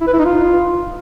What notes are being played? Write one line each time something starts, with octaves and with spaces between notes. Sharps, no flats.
E4
B4
E4
D#4
F4